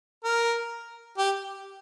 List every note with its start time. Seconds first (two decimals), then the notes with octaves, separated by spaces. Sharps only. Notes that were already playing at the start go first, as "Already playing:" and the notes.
0.24 A#4
1.18 G4